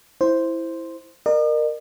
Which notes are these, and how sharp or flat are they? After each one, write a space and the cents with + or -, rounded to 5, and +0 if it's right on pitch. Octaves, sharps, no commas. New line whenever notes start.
E4 +0 C5 +0
A#4 +0 D#5 -45